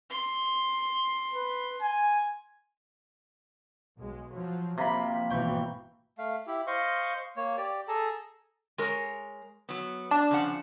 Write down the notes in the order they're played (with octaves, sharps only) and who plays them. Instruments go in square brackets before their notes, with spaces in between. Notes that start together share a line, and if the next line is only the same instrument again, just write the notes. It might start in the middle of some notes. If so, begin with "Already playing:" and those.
[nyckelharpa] C6
[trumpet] B4
G#5
[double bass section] B1 G#3
F3 F#3
[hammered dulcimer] C3 A#3 B5 [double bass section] F3
[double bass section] G#1 B2 E3 [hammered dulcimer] G5 C#6
[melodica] A3 F5
E4 G4
C5 D#5 F5 C#6
A#3 C#5
G4 D5
G#4 A4 A5 A#5
[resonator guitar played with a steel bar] G#3 A#4 C#5
F#3 B3
[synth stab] D4 E7
[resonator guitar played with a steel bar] C#3 F3 F#5